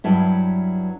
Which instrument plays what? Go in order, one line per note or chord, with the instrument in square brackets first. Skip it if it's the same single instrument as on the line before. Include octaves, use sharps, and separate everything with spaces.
[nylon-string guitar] G2 F#3 E4